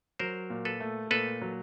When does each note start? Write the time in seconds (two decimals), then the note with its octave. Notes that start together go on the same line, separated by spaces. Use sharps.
0.19 F#3 A#4 C5
0.50 A#2
0.65 A4 B4
0.80 A3
1.11 A#2 A4 B4
1.42 F#3